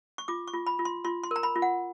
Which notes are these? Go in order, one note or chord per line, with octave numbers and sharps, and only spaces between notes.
C#6
F4 D6
C#6
F4
B5
F4
C6
F4 C6
C6
A#4 A#5
B5
F4
F#5